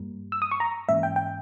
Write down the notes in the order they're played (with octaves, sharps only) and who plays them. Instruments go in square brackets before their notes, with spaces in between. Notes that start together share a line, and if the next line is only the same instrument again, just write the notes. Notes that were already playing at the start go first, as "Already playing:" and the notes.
Already playing: [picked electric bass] G2 G3 A#3
[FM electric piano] E6
D#6
C#6
A#5
[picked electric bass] G#2 E3 A#3 C#4 [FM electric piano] E5
[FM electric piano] G5
G5